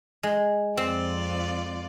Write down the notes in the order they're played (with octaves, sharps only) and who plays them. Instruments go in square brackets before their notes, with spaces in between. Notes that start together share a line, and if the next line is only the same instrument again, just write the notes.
[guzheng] G#3
[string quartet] F2 F4 D5 [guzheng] C4